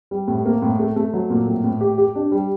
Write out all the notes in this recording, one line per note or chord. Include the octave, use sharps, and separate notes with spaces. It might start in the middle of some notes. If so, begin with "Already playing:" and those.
G3
A2
A#3
A2
A3
A3
F#3
A#2
A2
A2
G4
G4
D4
G3